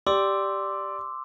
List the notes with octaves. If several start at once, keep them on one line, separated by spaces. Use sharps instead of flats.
G4 D5 C6 D6 E6